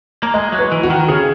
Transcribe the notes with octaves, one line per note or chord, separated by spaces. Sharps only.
A#3
G#3 D#5
F#3
B4
E3
F#4
D#3
C#3 G#4